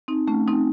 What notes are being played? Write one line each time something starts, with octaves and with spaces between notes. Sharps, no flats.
C4 D#4
A3 C#4
C4 D#4